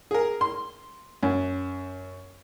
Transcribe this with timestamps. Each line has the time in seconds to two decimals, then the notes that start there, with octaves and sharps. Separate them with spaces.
0.11 G#4 A#4
0.41 C6
1.23 F#2